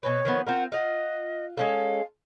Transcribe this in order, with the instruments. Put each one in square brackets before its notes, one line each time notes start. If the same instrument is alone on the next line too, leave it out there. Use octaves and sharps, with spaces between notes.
[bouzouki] B2 C4 B4 [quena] C#5
[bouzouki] D#3 F3 B3
[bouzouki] C4 F4 A#4 [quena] F#5
[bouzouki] F4 F5 F#5 [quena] D#5
[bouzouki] G#3 C#4 A4 [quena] F5